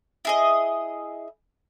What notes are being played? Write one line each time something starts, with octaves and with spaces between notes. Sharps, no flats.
E4 G#4 D#5